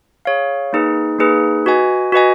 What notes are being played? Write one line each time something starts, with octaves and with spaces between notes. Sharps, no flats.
G#4 C#5 F5
A#3 D#4 G#4 B4
A#3 D#4 G#4 B4
F#4 B4 D#5 G#5
F#4 B4 D#5 G#5